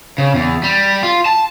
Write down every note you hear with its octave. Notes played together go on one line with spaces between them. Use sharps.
C#3
E2
G3
F4
A5